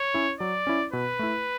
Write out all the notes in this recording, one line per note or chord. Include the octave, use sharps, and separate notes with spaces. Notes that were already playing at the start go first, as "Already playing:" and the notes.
Already playing: C#5
C#4 E4
F#3 D5
C#4 E4
B2 B4
A3 E4